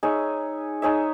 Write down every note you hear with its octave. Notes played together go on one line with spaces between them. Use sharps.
D#4 G#4 C#5 E5
D#4 G#4 C#5 E5